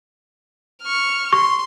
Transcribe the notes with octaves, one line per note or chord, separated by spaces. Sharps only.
C#6 F6
C6 C#6